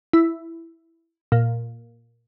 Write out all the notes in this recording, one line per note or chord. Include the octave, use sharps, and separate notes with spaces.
E4
A#2